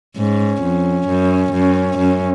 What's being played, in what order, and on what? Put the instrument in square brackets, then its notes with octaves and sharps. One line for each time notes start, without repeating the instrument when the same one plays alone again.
[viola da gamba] G#2 [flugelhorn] C#4
[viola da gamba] F2
F#2
F#2
F#2